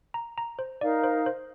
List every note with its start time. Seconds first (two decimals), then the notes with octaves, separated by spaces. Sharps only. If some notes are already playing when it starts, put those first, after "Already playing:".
0.14 A#5
0.38 A#5
0.59 C5
0.81 D#4 A#4 D5 F5
1.04 C5
1.26 C5